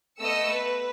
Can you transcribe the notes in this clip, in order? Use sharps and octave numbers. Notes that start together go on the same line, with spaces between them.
A3 B3 D#5 E6 C#7
B4